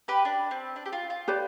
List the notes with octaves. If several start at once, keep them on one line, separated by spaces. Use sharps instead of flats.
G4 B4
D4
C4
D4
G4
F4
F4
G4 B4 D5